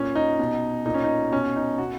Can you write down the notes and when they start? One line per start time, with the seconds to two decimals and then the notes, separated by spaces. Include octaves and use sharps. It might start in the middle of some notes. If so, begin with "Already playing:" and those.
Already playing: A#2 C#4
0.15 D#4
0.39 B2
0.86 A#2 D#4
0.94 C#4
1.04 D#4
1.32 B2 C#4
1.56 D#4
1.78 B2 F#4